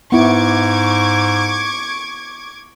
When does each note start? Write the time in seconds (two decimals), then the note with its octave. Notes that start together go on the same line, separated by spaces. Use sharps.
0.12 G#2 B3 E4 C#6 D6 G#6